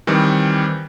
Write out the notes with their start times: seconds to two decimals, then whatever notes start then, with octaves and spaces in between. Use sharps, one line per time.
0.07 D#3 E3 G3 C4